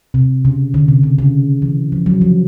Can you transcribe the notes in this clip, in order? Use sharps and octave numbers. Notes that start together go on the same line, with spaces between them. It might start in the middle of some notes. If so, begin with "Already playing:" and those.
C3
C#3
D3
C3
C#3
C#3
E3
F3
F#3
F3